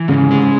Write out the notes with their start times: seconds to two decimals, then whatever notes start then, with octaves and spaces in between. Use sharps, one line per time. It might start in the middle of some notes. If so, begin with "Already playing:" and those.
Already playing: E3
0.08 G#2 C#3
0.31 G#3